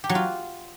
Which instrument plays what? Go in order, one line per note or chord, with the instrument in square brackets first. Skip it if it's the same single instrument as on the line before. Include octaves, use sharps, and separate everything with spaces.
[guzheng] G4
F#3
F4